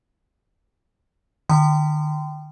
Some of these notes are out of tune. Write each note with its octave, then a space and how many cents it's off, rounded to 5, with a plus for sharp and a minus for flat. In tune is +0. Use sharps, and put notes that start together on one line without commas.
D#3 -45 G5 -15 C6 -30